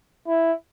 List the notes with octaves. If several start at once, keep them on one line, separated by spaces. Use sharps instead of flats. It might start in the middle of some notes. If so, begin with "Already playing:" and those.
E4